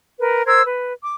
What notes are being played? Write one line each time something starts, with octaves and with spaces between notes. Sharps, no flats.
A#4 B4
A#4 C5 E6 G#6
B4
D6